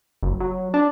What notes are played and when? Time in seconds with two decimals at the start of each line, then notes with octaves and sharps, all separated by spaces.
0.23 F#1
0.40 F#3
0.74 D4